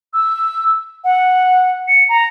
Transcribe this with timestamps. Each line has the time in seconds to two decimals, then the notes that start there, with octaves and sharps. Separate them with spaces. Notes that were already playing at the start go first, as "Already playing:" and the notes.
0.14 E6
1.04 F#5
1.88 C#7
2.09 A#5